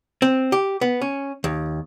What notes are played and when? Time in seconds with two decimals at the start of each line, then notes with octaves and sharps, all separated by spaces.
0.22 C4
0.52 G4
0.81 B3
1.01 C#4
1.44 D#2